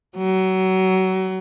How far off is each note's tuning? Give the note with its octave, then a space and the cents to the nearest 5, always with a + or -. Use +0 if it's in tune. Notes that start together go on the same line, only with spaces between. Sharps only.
F#3 +25